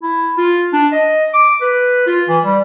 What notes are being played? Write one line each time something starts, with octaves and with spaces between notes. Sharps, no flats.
E4
F4
D4
D#5
D6
B4
F4
E3
G3